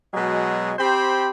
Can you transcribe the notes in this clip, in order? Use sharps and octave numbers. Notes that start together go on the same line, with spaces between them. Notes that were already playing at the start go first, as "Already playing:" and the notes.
B2 F#3 G#3
C4 G4 C5 B5